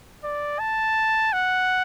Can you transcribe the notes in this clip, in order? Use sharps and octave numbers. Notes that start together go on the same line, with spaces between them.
D5
A5
F#5